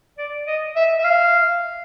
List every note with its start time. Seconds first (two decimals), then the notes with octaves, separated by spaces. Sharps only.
0.18 D5
0.47 D#5
0.76 E5
0.99 E5
1.04 F5